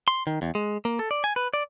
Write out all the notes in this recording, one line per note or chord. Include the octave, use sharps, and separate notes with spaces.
C6
D#3
E2
G#3
A#3
A4
D5
G#5
B4
D5